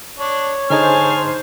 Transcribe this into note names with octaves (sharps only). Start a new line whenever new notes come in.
D4 C#5
D3 D#4 G#4 C5 G#5 A5 F6